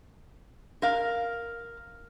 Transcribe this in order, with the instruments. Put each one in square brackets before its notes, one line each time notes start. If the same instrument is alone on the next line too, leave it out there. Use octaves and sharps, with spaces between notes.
[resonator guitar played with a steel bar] A#4 F5